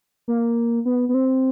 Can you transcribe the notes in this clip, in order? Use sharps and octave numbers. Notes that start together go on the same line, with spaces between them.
A#3
B3
B3
C4